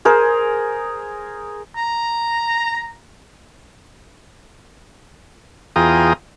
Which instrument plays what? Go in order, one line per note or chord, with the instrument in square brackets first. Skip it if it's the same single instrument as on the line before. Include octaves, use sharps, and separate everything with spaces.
[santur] G#4 A#4 C5
[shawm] A#5
[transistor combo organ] E2 F4 G#4 G5 A#5 D#6